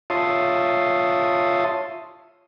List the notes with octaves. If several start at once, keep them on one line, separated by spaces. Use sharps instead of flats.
F4 C#5 E5 A5 C6 D#6